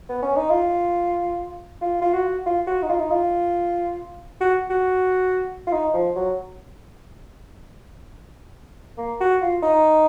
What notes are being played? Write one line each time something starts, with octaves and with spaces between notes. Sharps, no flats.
B3
C#4
D#4
F4
F4
F4
F#4
F4
F#4
D#4
F4
D#4
F4
F#4
F#4
F4
D#4
F3
F#3
A#3
F#4
F4
D#4